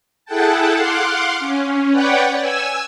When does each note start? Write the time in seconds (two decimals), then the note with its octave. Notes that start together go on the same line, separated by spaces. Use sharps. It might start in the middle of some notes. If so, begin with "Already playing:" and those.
0.25 E4 G#4 A4 F#5 G5 A5
0.74 F5 F#5 C6 D6
1.39 C#4
1.91 B4 C#5 D5 F#5 G5
2.39 G#5 E6